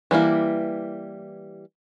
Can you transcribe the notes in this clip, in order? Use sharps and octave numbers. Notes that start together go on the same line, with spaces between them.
E3 G3 A#3 E4